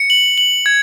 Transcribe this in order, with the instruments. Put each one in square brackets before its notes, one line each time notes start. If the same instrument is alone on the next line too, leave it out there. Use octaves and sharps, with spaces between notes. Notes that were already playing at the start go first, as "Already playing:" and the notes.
Already playing: [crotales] C#7
F#7
F#7
G#6